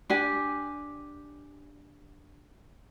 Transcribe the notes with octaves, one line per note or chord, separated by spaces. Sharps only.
D4 G4 G#5